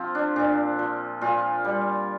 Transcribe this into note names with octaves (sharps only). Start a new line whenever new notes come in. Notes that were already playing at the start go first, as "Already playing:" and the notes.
Already playing: F3 C4 F4
D4
A#2 D4
F3
A#2 F4
G3